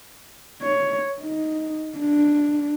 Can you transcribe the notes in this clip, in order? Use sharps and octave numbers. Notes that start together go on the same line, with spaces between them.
C#5
D#4
D4